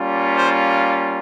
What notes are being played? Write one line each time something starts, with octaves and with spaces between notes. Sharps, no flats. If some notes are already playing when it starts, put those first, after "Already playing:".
Already playing: G3 A#3 C#4 F4
C5